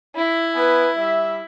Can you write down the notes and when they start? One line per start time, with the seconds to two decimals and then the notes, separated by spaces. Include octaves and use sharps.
0.16 E4
0.55 B3 B4 G#5
0.97 G3 E5